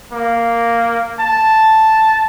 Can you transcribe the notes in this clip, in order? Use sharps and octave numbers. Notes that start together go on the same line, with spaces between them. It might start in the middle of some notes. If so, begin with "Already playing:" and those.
A#3
A5